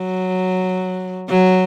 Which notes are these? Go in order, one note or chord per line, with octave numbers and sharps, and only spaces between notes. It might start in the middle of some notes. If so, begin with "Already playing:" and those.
Already playing: F#3
F#3